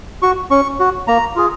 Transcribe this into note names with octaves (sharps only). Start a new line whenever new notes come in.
F#4 C#6
C#4 C#6
F#4
A#3 A#5
F4 G#4